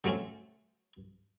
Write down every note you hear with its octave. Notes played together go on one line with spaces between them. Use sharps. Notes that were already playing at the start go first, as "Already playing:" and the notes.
D3 F#3 A3 C4 C#4